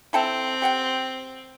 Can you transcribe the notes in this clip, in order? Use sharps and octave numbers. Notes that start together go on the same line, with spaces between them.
C4 E4 A4 G5
G4 F#5 G5